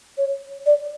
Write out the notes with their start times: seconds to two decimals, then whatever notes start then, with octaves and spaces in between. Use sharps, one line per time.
0.17 C#5
0.66 D5